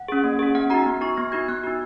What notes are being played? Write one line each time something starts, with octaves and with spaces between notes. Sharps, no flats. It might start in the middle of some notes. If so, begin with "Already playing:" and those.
Already playing: F#5
C#4 G#4
A#3
C#4 G#4
B3 F#5
D#4 F#4 A#5
B3
D#4 F#4 C#6
B3 A#6
D#4 F#4 G#6
B3 F#6
D#4 F#4